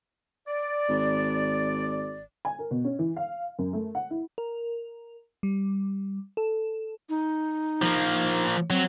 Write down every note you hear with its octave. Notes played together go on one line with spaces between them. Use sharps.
D5
G#1
G#5
A#4
B2
C#4
E3
F5
F#2
A3
F#5
E4
A#4
G3
A4
D#4
F3 A#3
F#3 C4